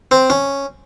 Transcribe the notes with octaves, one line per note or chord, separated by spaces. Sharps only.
C4
C#4